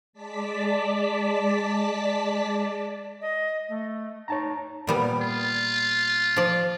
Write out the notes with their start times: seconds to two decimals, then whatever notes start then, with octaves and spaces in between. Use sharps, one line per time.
0.13 G#3 D5 A5 B6
3.21 D#5
3.68 A3
4.28 D#4 C#5 A5 A#5
4.87 A#2 G3 B3
5.21 F4
6.37 F3 D5